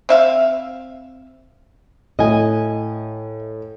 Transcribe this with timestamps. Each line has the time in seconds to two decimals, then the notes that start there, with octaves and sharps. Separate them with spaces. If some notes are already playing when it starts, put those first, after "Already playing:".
0.09 C4 E5 F5
2.19 A2 D#5 G#5